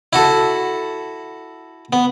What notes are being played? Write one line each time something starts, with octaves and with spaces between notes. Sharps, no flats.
E4 F#4 A4
B3